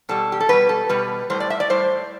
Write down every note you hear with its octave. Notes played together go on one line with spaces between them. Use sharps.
B2 G3 A4
G4
A4
B2 G3 B4
A4
B2 G3 B4
A2 G3 C5
D5
E5
D5
A2 G3 C5